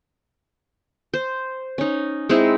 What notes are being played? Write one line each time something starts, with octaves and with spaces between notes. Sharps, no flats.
C5
C#4 D#4
G#3 C4 D#4 E4